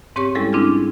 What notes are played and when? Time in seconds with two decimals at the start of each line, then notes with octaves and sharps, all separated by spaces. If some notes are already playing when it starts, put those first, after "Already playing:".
0.16 G#2 C4 G4 C#5 C#6
0.35 G3 G#3 C#4 E4 G#4 A4
0.53 C4 D4 E4 F4 G#4